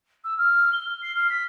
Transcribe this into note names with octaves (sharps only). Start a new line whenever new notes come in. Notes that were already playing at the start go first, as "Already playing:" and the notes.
E6
F6
G7
C7
F6
B6